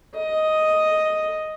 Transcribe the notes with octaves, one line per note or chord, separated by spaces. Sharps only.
D#5